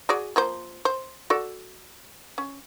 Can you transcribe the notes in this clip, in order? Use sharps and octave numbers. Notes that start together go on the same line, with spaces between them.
F#4 G#4 D5
F3 A#3 C5
C5
F#4 A4 D5
C#4